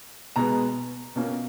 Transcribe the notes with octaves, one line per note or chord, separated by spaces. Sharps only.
B2 G#3 B3 A#5
B2 A#3 C#4